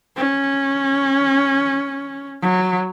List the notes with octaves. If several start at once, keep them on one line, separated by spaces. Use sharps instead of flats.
C#4
F#3